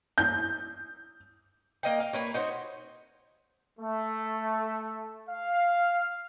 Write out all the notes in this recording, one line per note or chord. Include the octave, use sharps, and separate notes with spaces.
G6
A#3 D#5 G5
F5
A#3 B4 C#5
D#4 F#4 C5 C#5
A3
F5